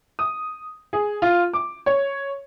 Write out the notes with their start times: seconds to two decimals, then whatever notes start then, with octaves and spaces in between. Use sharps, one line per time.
0.19 D#6
0.93 G#4
1.22 F4
1.54 D6
1.86 C#5